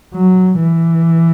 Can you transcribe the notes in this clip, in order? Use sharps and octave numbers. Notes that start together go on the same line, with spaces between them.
F#3
E3